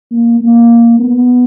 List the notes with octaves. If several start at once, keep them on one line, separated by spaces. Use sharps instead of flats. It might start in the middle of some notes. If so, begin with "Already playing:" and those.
A#3
A#3
B3